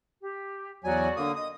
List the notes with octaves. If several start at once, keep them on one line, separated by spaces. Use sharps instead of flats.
G4
E2 F#3 F#4 D5 G#5
D3 A#3 D#6
D#5 D#6